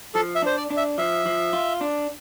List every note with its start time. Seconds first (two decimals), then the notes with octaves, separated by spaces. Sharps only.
0.15 F3 A4
0.35 E5
0.42 D4 C5
0.57 D5
0.70 D4
0.77 E5
0.98 F3 E5
1.26 F3
1.53 F4
1.81 D4